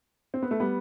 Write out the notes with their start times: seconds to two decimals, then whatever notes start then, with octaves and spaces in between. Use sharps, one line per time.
0.34 C4
0.42 B3
0.51 A3
0.60 G3 B3